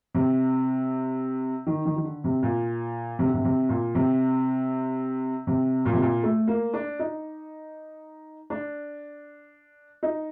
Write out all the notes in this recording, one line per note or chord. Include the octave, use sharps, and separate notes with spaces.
C3
D#3
D#3
D#3
D3
C3
A#2
C3
D3
C3
C3
A#2
C3
C3
A#2
C3
A#2
A3
A#3
D4
D#4
D4
D#4